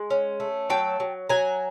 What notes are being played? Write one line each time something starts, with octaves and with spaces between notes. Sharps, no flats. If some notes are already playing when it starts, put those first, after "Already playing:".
Already playing: G#3 G#5
C#4
A3
F#3 G5 A5
F#3
F#3 G#5 A#5